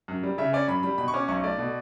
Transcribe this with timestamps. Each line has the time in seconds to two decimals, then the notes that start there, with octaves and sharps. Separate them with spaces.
0.08 F#2
0.23 G3
0.38 C#3 E5
0.53 C#4 D5
0.68 F#2 B5
0.83 G3 B5
0.98 B2 B5
1.08 C#6
1.14 C#4 D6
1.28 B1 C#6
1.44 A3 D5
1.58 B2